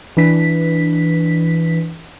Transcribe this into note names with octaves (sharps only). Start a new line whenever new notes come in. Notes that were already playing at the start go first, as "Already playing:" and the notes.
E3 D4 B4 B6